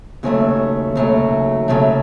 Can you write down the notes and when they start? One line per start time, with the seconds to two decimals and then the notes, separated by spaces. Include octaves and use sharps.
0.23 D#2 C#3 F#3 A3
0.95 D#2 C#3 F#3 A3
1.68 D#2 C#3 F#3 A3